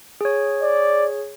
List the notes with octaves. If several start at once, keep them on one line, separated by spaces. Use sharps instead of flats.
G#4 C#5
D5